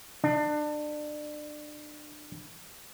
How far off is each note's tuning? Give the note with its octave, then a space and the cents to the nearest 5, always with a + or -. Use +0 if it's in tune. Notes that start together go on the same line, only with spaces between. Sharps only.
D4 +30